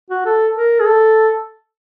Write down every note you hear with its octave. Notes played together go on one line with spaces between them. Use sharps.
F#4
A4
A#4
G#4
A4